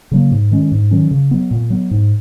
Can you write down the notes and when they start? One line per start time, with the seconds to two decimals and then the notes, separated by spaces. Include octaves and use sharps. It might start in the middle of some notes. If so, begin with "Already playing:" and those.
0.11 C#3 F#3 A#3
0.31 G#2
0.51 D#3 G#3 C#4
0.72 G#2
0.91 D#3 F#3 C#4
1.11 C#3
1.31 F#3 B3
1.51 A#2
1.70 F#3 B3
1.91 G#2